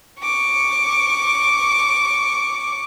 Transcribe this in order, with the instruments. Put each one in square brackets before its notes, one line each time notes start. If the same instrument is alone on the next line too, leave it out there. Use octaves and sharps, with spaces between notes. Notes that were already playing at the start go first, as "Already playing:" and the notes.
[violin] C#6 D6